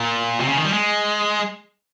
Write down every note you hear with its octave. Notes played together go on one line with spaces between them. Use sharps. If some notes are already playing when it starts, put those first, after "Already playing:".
Already playing: A#2
C3
C#3
D#3
G3
G#3